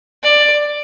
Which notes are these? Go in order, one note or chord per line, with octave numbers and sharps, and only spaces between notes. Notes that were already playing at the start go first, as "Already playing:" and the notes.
D5